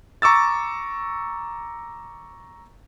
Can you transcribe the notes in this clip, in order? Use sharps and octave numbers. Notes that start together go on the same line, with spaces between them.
A#5 C#6 D6 E6 A6